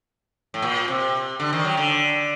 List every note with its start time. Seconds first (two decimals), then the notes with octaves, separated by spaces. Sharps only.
0.54 A2
0.62 A#2
0.88 C3
1.40 D3
1.53 D#3
1.64 F#3
1.77 D3